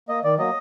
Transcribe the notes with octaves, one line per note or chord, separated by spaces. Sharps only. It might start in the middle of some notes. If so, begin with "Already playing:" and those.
A#3 D#5
D#3 D5
F#3 A#3 D#5